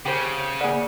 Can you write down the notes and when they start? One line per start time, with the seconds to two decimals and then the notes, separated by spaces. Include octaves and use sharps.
0.05 C#3 G4 C5
0.61 A#3 B3 G#4 D5